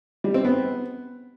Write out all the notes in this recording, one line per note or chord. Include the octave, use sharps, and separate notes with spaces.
G3
C4
B3